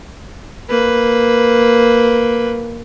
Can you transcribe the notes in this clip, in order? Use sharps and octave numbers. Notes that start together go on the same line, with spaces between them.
A#3 B4